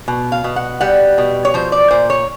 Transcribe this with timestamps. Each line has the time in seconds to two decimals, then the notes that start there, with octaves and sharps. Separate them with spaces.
0.08 B2
0.32 F5
0.44 B2
0.56 F#5
0.81 G3 F#5
1.18 B2
1.45 C#5
1.54 F3 C5
1.72 D5
1.91 A#2 C5
2.10 C#5